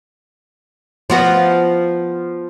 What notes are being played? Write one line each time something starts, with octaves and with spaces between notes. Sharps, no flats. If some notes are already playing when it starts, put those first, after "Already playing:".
F3 B3 F#4